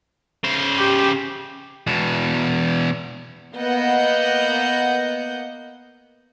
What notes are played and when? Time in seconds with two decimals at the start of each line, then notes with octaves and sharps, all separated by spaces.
0.44 C#3 C5
0.79 G4
1.87 E2 B2
3.56 A#3 B3 D#5 F#5 G6